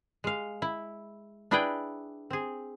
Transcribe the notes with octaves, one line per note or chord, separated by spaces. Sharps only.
G#3 F5
E4
D4 E4 G#4 B4 D5 G5
C4 G#4